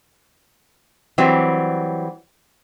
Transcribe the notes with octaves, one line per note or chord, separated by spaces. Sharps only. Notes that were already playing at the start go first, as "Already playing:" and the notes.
E3 F#3 G3 C4